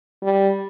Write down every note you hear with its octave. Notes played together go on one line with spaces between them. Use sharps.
G3